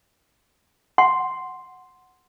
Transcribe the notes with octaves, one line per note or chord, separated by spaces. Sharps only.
F#5 C6